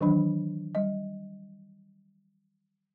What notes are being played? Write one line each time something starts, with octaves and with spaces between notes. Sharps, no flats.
D#3 E3 F#3 D4 B5
G3 D#5